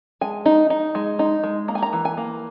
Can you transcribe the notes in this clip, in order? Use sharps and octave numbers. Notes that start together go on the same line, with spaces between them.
G#3 G#5
D#4
D#4
G#3
D#4
G#3
A#3 A#5
G#5
A#5
E3
G#5
A#3